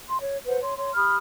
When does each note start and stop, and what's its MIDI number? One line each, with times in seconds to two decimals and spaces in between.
0.07 0.21 84
0.21 0.38 73
0.47 0.60 71
0.47 0.60 72
0.47 0.60 78
0.62 0.74 73
0.62 0.74 84
0.77 0.93 73
0.77 0.93 84
0.94 1.17 67
0.94 1.17 83
0.94 1.17 87
0.94 1.17 89